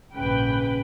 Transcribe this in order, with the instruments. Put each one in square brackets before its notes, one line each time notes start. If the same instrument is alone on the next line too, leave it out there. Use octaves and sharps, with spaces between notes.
[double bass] A#1 G#2 [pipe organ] C#3 C#4 [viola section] B4 G5